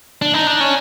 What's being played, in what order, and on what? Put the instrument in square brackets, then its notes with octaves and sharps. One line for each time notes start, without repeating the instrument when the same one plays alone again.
[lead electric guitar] D4
D#4
D4
C#4